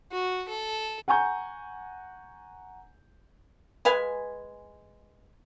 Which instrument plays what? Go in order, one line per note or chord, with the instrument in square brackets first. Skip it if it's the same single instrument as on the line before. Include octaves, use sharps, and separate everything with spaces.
[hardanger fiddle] F#4
A4
[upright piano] F#5 G#5 A#5 C#6 G6
[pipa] G#3 B4 F5 G#5